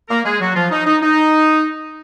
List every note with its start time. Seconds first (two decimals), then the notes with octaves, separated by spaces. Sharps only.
0.09 A#3 A#4
0.24 G#3 G#4
0.40 F#3 F#4
0.55 F3 F4
0.71 D#4
0.86 D#4
1.02 D#4